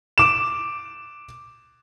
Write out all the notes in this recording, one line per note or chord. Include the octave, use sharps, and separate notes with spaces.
D6 E7